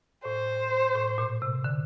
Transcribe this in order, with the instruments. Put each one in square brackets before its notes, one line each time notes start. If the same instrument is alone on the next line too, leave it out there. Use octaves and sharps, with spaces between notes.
[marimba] A2 [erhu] C5
[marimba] A2
A#2
C3
D3